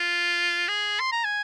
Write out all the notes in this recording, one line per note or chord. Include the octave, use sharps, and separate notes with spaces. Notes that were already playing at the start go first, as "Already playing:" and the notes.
Already playing: F4
G#4
C6
A#5
G#5